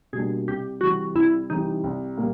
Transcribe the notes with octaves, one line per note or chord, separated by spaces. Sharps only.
B2 G3 A#3 D4 G#4
C2 G4
C3 E3 G3 F#4
C2 E4
C3 E3 G3 D#4
C2
A#2 G3 A#3